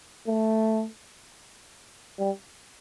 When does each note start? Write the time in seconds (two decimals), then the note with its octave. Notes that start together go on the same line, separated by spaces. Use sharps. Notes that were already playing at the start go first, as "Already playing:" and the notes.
0.28 A3
2.19 G3